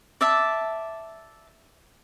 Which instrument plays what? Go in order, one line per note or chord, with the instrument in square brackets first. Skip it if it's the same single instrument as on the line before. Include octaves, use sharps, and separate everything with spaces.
[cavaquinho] D5 E5 A5